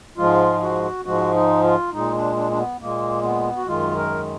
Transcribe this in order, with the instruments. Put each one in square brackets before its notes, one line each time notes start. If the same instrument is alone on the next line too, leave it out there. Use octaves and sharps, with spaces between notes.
[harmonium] G#2 F3 G#3 F4
F#4
G#2 F3 G#3 F#4
D#4
F4
A#2 G#3 D#4
D4
D4
D4
B3
A#2 G#3 A#3
B3
F#4
F#2 D#3 G#3 F4
A#4